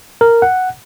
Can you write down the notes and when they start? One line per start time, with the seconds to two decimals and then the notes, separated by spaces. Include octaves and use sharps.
0.21 A#4
0.42 F#5